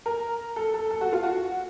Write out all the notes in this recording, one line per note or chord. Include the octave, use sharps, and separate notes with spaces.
A#4
A4
A4
A4
F#4
F4
F#4